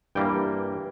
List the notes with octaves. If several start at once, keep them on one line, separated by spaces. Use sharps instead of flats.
G2 E3 G3 A#3 G5